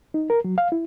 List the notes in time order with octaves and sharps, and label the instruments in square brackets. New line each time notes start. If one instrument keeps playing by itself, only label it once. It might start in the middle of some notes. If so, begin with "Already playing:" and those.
[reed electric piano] D#4
A#4
F#3
F5
E4